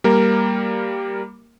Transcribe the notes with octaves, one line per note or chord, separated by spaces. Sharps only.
G3 A#3 A#4